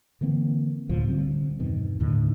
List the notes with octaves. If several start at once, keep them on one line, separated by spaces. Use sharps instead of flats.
D3 E3 A#3 C4
D2 A2 C3 F3
D3 G3 C4
E2 G2 B2 D#3
D#2 A2 D3 D#3